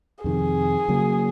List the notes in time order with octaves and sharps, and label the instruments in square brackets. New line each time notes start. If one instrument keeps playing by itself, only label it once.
[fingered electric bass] F2 C3 D#3 [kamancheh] G#4
[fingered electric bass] C#3 F#3 A#3